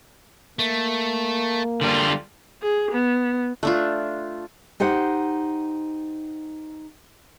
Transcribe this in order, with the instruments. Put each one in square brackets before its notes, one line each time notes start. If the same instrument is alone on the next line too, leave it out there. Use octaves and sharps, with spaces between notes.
[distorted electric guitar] A3 [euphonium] A#3
[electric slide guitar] D3 G3 F4
[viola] G#4
B3
[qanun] A3 D4 F4
[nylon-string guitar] D#4 G4 C5 F#5